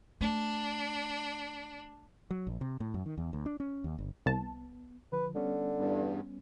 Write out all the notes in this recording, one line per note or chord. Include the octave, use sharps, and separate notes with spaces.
A3 D4
F#3
A#1
C3
A2
F#2
D#3
E2
D2
D4
C#4
D#2
G1
C2 B3 A5
D3 F3 B4
D3 G3 B3 C#4
E2 G2